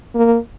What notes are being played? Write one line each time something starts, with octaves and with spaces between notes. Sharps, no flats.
A#3